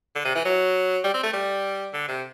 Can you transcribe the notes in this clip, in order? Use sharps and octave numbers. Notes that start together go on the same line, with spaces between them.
D3
C3
E3
F#3
G3
C4
A3
G3
D3
C3